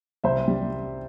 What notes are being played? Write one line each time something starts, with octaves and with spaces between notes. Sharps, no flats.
C2 C5 E5
G3